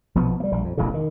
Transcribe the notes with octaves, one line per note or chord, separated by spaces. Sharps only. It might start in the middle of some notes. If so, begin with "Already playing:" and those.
A#1 B2 F3 B3
G3 A#3
A#1 G3
F2
E1 A1 E2 C#3
D#3